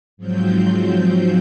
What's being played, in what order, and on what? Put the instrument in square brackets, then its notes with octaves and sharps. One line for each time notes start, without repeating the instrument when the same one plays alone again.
[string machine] G#2 F3 F#3 C4 G6